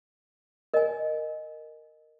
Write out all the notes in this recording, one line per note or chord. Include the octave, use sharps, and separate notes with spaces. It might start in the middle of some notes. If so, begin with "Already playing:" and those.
A#4 D#5 G#5